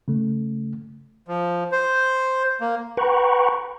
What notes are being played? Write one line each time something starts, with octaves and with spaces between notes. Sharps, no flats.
C#3 A3
F3
C5
A#3
B4 F#5 G5 A#5 B5 C#6